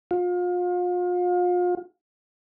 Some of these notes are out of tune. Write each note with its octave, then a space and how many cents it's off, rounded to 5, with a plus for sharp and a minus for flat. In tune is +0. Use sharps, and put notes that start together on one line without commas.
F4 +35